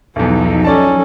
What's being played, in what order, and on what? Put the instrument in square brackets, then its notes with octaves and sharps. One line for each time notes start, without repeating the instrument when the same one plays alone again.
[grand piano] B1 E2 [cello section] F3 F#3 D#4 [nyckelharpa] A4
[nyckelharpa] C#4 A4 [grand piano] D5 A5